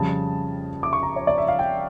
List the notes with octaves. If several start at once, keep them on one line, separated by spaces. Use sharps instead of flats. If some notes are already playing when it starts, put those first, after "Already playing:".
Already playing: F2 C#3 G3 A5
D6
C#6
A#5
C#5
D5
E5
F5
G5